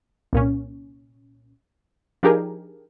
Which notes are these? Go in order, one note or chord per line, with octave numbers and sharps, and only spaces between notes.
C2 A#2 C#4
F3 D4 D#4 G4 G#4 A#4